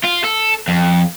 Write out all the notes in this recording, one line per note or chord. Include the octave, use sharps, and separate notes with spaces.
F4
A4
F2